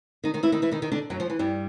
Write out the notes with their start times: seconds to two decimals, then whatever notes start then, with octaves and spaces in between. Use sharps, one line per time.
0.24 D#3 D#4
0.34 D#3 D#4
0.43 E3 E4
0.52 D#3 D#4
0.62 E3 E4
0.71 D#3 D#4
0.82 D#3 D#4
0.92 D3 D4
1.10 F#2 F#3
1.20 F3
1.30 E3
1.39 G2 G3